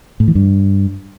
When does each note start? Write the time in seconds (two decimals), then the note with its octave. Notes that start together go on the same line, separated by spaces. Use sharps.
0.20 A2
0.28 E3
0.35 G2